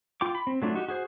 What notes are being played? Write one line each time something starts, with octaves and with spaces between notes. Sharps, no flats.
F4 G5 D6
B5
C4
F#3 A3 D4 F4
D#4 F#4 G4
F#4 G#4 C5